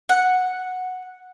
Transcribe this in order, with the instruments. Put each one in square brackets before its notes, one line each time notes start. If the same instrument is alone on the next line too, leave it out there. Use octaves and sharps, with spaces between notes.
[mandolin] F#5